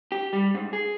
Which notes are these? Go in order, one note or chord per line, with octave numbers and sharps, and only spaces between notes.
G4
G3
G#2
G#4